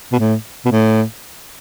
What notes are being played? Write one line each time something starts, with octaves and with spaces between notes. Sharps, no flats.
B2
A2
B2
A2